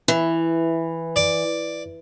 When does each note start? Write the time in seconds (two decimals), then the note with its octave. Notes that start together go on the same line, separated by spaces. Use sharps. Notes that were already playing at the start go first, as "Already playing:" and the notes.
0.08 E3
1.16 D5